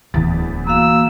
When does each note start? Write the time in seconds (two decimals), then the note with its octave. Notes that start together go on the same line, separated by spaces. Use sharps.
0.14 D1 E2 A6
0.67 A#3 F#4 F5 E6